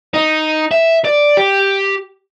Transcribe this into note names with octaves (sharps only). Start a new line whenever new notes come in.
D#4
E5
D5
G4